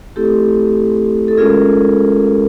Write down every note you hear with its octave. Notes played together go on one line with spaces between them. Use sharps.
A3 C4 E4 G4 A4
A4
G#3 C#4 F4 G#4 A#4